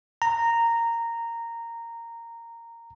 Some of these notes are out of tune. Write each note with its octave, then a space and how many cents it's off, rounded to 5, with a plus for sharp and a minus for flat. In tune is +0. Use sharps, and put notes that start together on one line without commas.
A#5 -10